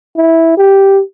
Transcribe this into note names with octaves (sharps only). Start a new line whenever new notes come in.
E4
G4